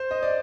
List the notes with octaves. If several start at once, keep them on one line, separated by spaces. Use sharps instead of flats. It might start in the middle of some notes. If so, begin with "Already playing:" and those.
Already playing: C5
D#5
D5